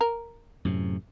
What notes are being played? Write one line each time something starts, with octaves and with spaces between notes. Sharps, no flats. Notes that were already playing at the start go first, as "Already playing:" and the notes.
A#4
F#2 A2 C3